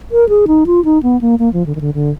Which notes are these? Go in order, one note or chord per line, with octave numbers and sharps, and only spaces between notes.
A#4
G#4
D#4
F4
D#4
B3
A#3
A#3
F3
D3
D#3
D3
D3